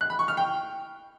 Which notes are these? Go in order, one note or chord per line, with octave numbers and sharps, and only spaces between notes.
F#6
B5
C#6
F6
G5